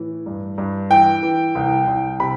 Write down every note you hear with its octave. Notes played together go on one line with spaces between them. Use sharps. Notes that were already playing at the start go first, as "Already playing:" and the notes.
Already playing: A2 E3
G2
G2
E3 G5
E3
C2
C2
C3 B5